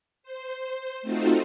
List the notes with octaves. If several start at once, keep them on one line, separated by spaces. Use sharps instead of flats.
C5
A3 C4 D#4 F4 F#4 C5